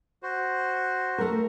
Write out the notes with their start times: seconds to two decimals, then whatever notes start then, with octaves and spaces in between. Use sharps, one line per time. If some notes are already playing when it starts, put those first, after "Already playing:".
0.23 F#4 C5
1.18 A3 A#4